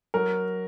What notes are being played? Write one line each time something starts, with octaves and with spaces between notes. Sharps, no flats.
F#3 A#4